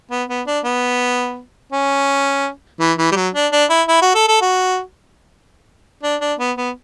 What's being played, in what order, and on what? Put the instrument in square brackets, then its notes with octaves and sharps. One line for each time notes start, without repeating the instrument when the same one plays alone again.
[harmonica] B3
B3
D4
B3
C#4
E3
E3
G3
F#3
D4
D4
E4
E4
F#4
A4
A4
F#4
D4
D4
B3
B3